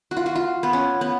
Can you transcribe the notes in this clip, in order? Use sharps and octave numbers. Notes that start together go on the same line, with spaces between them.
F#4
F4
F#4
F4
B3
C#4
B3